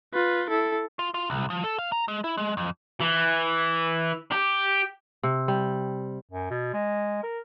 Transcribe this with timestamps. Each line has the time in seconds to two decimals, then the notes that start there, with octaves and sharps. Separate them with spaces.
0.14 F4 B4
0.50 E4 A4
0.99 F4
1.14 F4
1.30 C2
1.50 F3
1.64 A4
1.78 F5
1.92 A#5
2.08 G#3
2.24 E4
2.37 G#3
2.57 F2
3.01 E3
4.32 G4
5.23 C3
5.48 G3
6.31 F#2
6.50 B2
6.73 G#3
7.23 A#4